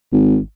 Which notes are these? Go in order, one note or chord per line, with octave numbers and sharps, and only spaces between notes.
G#1